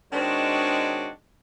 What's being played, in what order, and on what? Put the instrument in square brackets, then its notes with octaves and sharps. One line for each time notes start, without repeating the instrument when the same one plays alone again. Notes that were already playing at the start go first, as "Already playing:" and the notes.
[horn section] D#3 G#3 C4 D4 F#4 C#5